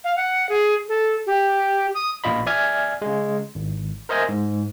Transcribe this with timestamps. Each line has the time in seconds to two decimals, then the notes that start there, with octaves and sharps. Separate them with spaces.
0.04 F5
0.17 F#5
0.49 G#4
0.89 A4
1.27 G4
1.95 D#6
2.24 A1 A#2 F4 D#5 B5
2.46 D5 E5 G#5 F6 G#6
3.02 C#3 G#3
3.55 G#1
4.09 A#4 C5 D#5 E5 G#5
4.29 G#2